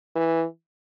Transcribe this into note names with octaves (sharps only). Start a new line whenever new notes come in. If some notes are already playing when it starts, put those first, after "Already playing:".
E3